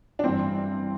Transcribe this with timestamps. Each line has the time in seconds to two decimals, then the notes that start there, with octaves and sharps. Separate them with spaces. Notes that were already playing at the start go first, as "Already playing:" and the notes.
0.19 D4
0.24 G2 E3 C4